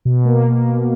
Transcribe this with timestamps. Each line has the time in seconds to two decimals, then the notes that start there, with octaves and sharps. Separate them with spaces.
0.05 B2
0.25 A#3